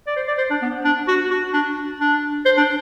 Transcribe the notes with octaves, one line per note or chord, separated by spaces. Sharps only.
D5
C5
D5
C5
D4
B3
D4
F#4
F#4
D4
D4
C5
D4